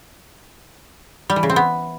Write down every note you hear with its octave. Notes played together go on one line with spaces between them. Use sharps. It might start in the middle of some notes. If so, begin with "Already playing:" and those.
G3
E3
C#3
C4
B3